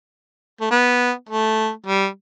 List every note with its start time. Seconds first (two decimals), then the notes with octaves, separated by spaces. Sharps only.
0.61 A3
0.71 B3
1.29 A3
1.86 G3